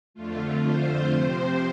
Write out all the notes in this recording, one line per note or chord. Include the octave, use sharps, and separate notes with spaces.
F2 D3 A3 F4
C5
C3 F3 C4